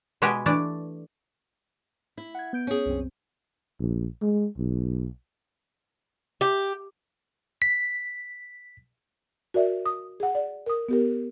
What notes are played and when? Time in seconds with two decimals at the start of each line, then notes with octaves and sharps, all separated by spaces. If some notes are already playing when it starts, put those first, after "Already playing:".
0.22 B2 G#3 F#4 G4 B4
0.46 E3 A3 D4 D5
2.18 E4
2.35 F#5 G#6
2.53 B3 G6 D7
2.67 C#4 G#4
2.86 C2 F#2 C4
3.79 A#1
4.22 G#3
4.58 B1
6.41 G4
7.62 B6
9.54 F#4 A#4 D5 E5
9.86 D#6
10.20 G#4 F#5
10.35 D5
10.66 A#4 D#6
10.89 B3 G4 A#4